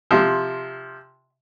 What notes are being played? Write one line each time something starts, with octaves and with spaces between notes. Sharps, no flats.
C3 F3